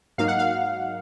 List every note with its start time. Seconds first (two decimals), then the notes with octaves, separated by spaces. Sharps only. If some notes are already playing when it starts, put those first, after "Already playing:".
0.18 G#2 F#3 A#3 D#4 F5
0.28 F#5
0.39 F5